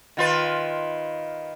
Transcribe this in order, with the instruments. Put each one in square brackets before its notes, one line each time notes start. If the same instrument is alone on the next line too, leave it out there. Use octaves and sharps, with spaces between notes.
[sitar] D#3 F4 B4